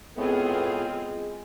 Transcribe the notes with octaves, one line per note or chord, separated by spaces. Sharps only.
A2 G#3 B3 C4 F4 G#4